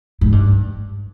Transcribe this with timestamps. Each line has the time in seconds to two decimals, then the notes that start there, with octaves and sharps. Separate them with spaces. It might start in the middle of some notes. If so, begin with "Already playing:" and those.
0.21 G#2
0.32 G2